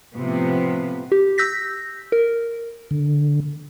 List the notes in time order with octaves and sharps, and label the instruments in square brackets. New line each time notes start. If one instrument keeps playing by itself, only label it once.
[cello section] A2 C3 F3 B3
[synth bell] G4
E6 G6 A#6 B6
A#4
[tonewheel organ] D3